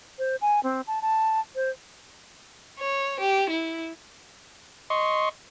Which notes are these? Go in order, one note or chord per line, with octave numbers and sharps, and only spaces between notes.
C5
G#5
C4
A5
A5
C5
C#5
G4
E4
D#5 C6 C#6